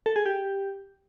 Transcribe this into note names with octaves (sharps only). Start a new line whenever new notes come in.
A4
G#4
G4